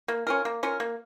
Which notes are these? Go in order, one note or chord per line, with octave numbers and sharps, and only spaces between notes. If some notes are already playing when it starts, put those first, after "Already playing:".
A#3
C#4 F4 A#4
A#3
C#4 F4 A#4
A#3